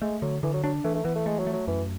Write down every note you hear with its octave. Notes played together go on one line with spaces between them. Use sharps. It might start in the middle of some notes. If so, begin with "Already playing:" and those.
G#3 A3
D3 F#3
D3 E3
F#3
F#3 D4
E3 A3
A3
E3 B3
A3
G#3 A3
F#3
A3
F#3
F#2 E3